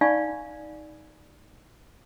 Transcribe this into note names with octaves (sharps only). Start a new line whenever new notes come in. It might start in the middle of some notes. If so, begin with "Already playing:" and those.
D#4 D5 F5 G#5 B5 C#6